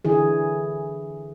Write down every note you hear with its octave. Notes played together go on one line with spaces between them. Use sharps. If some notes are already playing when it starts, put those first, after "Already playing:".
D3 E3 G#4